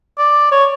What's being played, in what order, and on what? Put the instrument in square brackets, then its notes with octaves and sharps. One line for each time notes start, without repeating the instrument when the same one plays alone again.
[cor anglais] D5
C#5